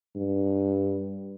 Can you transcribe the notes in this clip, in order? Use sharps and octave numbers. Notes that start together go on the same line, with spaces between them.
G2